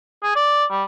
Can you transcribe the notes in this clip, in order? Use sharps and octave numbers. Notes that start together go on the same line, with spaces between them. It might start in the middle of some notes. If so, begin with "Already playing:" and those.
G#4
D5
G3